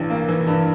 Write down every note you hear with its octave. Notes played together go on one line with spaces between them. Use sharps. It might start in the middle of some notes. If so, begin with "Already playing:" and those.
Already playing: A1 G2 E3
A#3
E3
G2